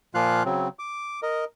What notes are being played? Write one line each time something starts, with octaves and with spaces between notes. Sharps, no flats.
A#2 F3 A#3 F4 F5 F#6
C#3 F#3 C4
D6
A#4 D#5